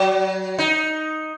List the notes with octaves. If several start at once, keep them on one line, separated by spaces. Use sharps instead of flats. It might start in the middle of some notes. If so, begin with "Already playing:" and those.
Already playing: F#3
D#4